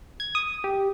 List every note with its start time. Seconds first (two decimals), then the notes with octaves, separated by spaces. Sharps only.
0.20 G#6
0.35 D#6
0.64 G4